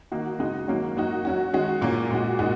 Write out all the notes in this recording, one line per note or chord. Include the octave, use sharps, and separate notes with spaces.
D#3 A#3 D#4 F#4
C#3 G#3 D#4 F#4
D#3 F#3 A#3 C#4 F#4
F#3 A#3 D#4 F#4
F#3 C#4 F#4
D#3 G#3 C#4 F#4
A#2 A#3 C#4
A#2 G#3 F#4
A#2 G#3 D#4 F#4